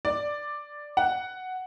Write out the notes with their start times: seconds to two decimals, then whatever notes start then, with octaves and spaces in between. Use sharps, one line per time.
0.05 D5
0.97 F#5